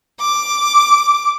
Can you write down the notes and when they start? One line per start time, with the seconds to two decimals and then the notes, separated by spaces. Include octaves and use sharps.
0.21 D6